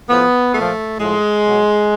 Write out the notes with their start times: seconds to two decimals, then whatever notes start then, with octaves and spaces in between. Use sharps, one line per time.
0.08 A2 F3 B3
0.54 A#2 F3 A3
0.99 A2 F3 G#3
1.44 B2 F#3